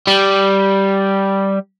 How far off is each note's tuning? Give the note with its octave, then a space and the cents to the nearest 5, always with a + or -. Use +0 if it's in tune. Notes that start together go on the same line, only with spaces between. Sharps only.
G3 -5